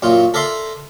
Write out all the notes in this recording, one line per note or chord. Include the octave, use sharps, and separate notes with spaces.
F#2 A#2 F4
A4 A#4 D5 E5 C6